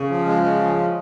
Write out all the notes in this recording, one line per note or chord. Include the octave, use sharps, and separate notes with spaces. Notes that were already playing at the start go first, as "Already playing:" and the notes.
Already playing: C#3
F3
G#3
F3